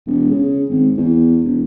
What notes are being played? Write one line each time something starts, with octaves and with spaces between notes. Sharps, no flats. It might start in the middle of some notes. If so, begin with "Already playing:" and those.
E1
C#3
G#1
E2
E1